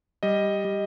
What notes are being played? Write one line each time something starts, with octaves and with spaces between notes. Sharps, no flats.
G3 D#5
G3